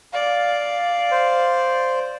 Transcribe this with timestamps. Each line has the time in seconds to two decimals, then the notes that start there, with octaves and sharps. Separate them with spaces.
0.14 D5 F5
1.11 C5